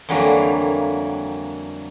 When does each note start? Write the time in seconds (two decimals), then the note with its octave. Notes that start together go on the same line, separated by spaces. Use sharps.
0.09 F2 D3 E3 F#3 G3 A#3